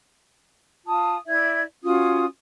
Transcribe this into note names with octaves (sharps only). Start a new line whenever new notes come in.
F4 A5 D#6
E4 D5 E5 G#6
C#4 F4 F#4 D#6